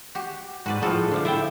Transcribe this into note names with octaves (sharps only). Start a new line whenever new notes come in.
F#4 G4
G#2 F#4 B4 D5
A2 F3 G#3 F#4 A4
D3 F3 A3
E4 F4 E5 G5